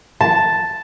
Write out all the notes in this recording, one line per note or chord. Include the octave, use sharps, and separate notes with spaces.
A5